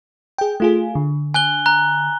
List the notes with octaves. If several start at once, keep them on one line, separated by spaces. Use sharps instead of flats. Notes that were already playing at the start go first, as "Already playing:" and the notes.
G#4 G5
A3 F4 G#4
D3
G#5 F#6 G7
A#5 F#6